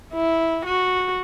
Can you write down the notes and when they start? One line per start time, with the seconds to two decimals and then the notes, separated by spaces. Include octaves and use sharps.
0.13 E4
0.65 F#4